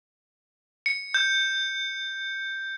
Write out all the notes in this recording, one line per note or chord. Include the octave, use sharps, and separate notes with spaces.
C#7
G6